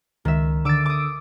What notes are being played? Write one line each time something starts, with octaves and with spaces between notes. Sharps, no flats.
C#2 D#3 E5
D3 D6 E6 A6 D7
D6 D#6